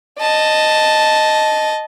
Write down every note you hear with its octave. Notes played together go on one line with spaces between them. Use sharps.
D#5 A5